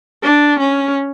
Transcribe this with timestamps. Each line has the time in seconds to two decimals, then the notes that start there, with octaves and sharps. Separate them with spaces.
0.23 D4
0.59 C#4